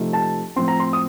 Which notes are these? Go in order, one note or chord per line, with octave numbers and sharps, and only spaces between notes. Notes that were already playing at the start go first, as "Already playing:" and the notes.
Already playing: C3 F3 A3 D#4
A5
A2 F3 C4 C6
A#5
C6
D#6